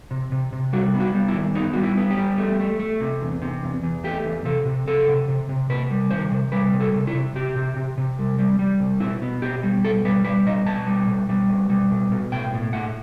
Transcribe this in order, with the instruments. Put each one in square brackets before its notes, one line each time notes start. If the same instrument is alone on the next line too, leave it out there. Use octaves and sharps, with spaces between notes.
[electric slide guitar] C3
C3
C3
G3 F#4
B3
F#4
G3
E4
D#3
B3 D#4
G3 F#4
E4
B3
G4
G3
A3
A3
A3
C3
E2
C3
E2
E2
A3 G4
E2
C3 A4
C3
C3 A4
C3
C3
C3
C3 B4
G3
D#3 C5
C3
G3 B4
C3
A4
C3
E4
C3
C3 G4
C3
C3
C3
G3
G3
G3
C3
B2 E4
B3
B2 G4
G3
B2 A4
G3 B4
G3 B4
B2 D#5
B2 A5
G3
B2
G3
B2
G3
B2
B2
A2 G5
A2
A2 F#5